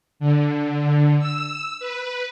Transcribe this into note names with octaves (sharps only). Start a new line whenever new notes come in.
D3
E6
B4